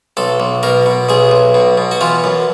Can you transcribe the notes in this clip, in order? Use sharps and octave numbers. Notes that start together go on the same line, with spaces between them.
B1 A4
B1
B2 A#4
B2
B1 G#4
B1
B2
B2
F#4
E3 F4
F#2